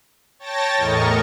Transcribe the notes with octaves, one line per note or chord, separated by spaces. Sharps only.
C#5 G5 A5 A6 A#6
E2 A2 A#4 D#5 C#6